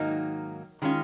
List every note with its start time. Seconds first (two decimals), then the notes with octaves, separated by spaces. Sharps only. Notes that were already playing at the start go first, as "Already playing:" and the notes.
Already playing: G#2 D#3 F#3 A#3 D#4
0.82 D#3 G#3 C#4 F4